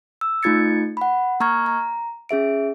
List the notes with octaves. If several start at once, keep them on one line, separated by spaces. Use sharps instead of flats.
E6
A3 D#4 F4 G#6 A6 C#7
F#5 B5
A#3 A#5 C#6 F6 G#6
A#5
C#4 G#4 E5 D7